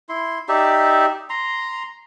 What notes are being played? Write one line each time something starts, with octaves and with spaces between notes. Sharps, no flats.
E4 C6
D#4 G4 D5 E5
A#5 C6